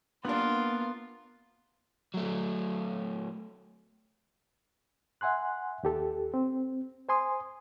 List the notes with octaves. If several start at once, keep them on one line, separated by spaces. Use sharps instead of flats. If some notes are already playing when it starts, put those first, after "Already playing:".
G2 A#3 B3 D4 F4 A#4
F#3 A3
E5 F#5 G#5 C6 F#6
D#2 G4 A4
C4
C5 G#5 C6 D#6